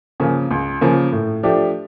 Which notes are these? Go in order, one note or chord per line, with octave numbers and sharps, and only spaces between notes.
C#3 F3 A#3 C#4
C#2
C#3 F3 A#3 C#4
A2
F3 A3 D4 G4